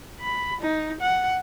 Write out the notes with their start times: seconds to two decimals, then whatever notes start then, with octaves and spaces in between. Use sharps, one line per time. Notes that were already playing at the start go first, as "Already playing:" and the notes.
0.20 B5
0.61 D#4
1.01 F#5